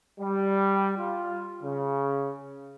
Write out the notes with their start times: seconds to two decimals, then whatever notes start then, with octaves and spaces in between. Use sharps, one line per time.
0.20 G3
0.98 F4
1.63 C#3